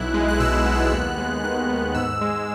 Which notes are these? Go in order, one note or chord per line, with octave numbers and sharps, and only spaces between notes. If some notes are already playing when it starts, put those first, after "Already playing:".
Already playing: B1 E4 F#6
G#3
F#6
B2 E6
B3
F#6
D#2
G#3
D#3 F#6
B3
G#2 E6
G#3